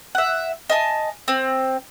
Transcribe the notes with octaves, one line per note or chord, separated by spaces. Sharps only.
E5 F#5
D#5 G#5 A5
C4